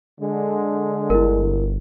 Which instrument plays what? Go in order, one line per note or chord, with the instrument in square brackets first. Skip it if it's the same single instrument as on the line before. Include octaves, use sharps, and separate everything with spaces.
[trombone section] D3 G#3
[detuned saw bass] G1 [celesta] E4 A#4